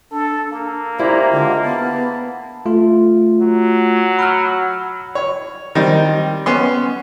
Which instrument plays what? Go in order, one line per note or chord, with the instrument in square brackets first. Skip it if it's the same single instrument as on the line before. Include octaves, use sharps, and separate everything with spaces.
[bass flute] D4 [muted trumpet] A4
[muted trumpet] A#3
[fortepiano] E4 [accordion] G4 C5 A#5 [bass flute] D5
[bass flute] D3 [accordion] G#3 F4 G4
[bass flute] B3 [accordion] A5
[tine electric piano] A3 F4
[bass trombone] F#3
[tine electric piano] B5 E6 F6
[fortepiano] C#5
D#3 G3 C4 D#4
B3 C#4 C6